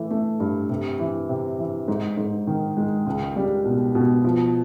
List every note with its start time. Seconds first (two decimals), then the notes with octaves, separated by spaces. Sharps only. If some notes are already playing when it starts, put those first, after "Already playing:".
Already playing: E3 A3
0.11 A3
0.40 G2
0.70 C3
0.99 E3
1.29 C3
1.58 E3
1.88 G#2
2.17 G#2
2.47 D#3
2.77 G#3
3.06 C#2
3.36 G3
3.65 B2
3.95 B2
4.24 F3